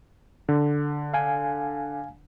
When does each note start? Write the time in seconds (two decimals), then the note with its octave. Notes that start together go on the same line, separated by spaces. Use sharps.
0.49 D3
1.14 F5 G#5